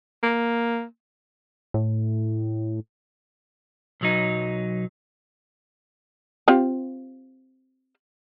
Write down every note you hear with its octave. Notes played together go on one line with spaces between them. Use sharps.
A#3
A2
B1 F#3 D#4
C4 F4 G4